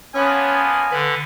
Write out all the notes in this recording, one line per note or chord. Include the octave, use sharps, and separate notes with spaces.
F3 A#3 B3 C#4 G#5
D3 B4